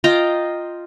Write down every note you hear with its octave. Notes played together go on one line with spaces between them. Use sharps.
F4 D#5 G5 A#5